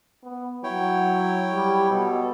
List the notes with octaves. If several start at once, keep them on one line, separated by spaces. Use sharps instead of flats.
B3
F#3 E4 C#5 G5
G3
B2 A4